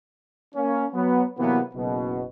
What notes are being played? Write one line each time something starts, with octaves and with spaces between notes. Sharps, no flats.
A#3 C#4
F#3 B3
C3 E3 F#3 A#3 B3
F#1 B2